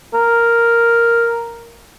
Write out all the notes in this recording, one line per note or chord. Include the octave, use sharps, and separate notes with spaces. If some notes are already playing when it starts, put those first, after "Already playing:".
A#4